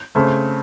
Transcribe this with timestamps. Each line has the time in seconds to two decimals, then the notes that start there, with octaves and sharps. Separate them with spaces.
0.15 C#3 A3 C4